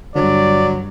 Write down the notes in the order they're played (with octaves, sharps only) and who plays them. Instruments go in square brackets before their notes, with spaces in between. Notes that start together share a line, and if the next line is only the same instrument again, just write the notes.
[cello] G2 [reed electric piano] D3 D4 [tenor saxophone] F#3 [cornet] D5